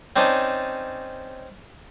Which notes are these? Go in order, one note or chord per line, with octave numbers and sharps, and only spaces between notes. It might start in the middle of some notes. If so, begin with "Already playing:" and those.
C4 C#4 D#4 D5 A5